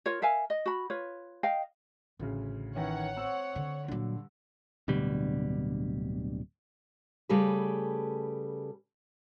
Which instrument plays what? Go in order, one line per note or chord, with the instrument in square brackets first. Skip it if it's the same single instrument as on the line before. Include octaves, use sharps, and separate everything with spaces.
[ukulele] F4 A#4 C#5
A#4 E5 F5 G#5
D#5
F#4 B5
F4 B4 C#5
D#5 F5 G5
[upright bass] A1 [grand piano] D2 C#3
[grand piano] D#3 E3 C#4 [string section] C#5 F#5
[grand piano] C4 E6
[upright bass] D3
[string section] G2 [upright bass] A#2 F#3 [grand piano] D3
[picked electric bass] D1 B2 D3 G3
[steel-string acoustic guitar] C#3 G3 A3 G#4 B4